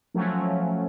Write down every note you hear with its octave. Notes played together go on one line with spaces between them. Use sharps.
F3 F#3 A3 C#4